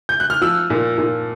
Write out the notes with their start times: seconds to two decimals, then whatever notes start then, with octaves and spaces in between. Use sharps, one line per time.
0.09 G6
0.20 F#6
0.30 F6
0.41 F3 E6
0.70 A#2
0.98 A#2